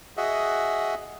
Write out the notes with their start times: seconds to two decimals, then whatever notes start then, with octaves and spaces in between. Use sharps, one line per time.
0.17 F#4 G#4 D#5 E5 F#5